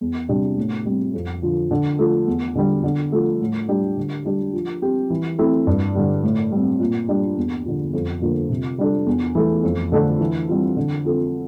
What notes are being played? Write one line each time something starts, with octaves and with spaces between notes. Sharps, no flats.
E2
C3 G3 D4 G4
A2
G3 C4
F2
D3 F3
D3
F3 A3
E2
D3 G3
D3
F3 A3
A2
G3 D4 G4
D3
G3 D4 G4
F3
C4 G4
E3
A3 C4 E4
G2
D3 G3
A2
G3 C4
A#2
G3 D4 G4
E2
D3 F3
F2
D3 F3 A#3
C3
G3 D4 A4
E2
E3 A3
F2
D3 A3 D4
E3
G3 C4 F4
D3
F3 C4 F4 A4